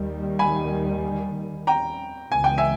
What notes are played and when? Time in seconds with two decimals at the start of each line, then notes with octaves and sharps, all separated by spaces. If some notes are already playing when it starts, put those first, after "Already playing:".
Already playing: D#2 D#3 G3
0.39 G#5 B5
1.67 G5 A#5
2.31 C#2 C#3 E3 G#3 B3 G#5
2.44 G5
2.58 E5 G#5